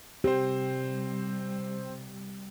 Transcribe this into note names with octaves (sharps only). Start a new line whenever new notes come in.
C3 G3 C4 G4 C5